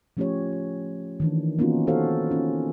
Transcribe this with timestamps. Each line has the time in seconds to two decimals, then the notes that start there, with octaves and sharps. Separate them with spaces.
0.17 F3 A3 C#4 F4 G4 C#5
0.53 F4
1.20 D#3 E3 D4
1.58 A#3 B3 C#4 D#4 F4 F#4
1.87 F#4 G4 A4 C5 C#5 F5
2.31 C#4 F4